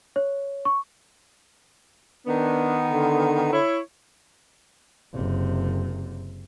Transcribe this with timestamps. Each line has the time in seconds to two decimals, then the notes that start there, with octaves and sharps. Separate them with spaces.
0.16 C#5
0.65 C#6
2.27 D#3 B3 D4
2.89 D3
3.53 E4 C#5
5.14 F#1 C3